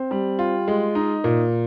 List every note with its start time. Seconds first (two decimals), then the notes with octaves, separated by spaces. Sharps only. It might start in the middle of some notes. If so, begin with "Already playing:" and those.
Already playing: C4
0.11 G3
0.39 F4
0.68 G#3
0.95 D#4
1.24 A#2